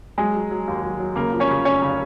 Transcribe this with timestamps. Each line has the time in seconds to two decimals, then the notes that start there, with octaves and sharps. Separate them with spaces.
0.18 F#3 G#3 G#4
0.34 F#3
0.51 F#3
0.68 D#2
0.83 F#3
1.00 F#3
1.16 C#3 A#3 A#4
1.33 F3
1.40 C#4 C#5
1.49 C#3
1.65 F1 C#4 C#5
1.82 C#3